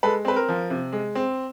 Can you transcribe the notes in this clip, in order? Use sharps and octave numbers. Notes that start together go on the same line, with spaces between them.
G#3 A4 B4
C4 B4
A#4
F3
C3
G#3
C4